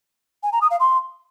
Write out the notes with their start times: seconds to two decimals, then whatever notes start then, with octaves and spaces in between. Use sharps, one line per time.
0.43 G#5
0.52 A#5
0.62 D#6
0.71 F5
0.80 C6